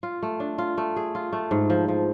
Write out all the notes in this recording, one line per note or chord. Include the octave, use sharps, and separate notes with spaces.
F4
A3
D4
F4
A3
G#4
F4
A3
G#2
F3
F3